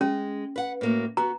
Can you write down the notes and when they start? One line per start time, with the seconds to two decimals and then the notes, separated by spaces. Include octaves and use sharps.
0.01 G#3 C#4
0.56 B4 F#5
0.81 A2 A#3 F#4
1.17 B3 F#4 A#5